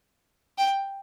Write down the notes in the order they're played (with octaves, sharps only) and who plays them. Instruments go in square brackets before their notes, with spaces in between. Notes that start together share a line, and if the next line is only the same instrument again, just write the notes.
[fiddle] G5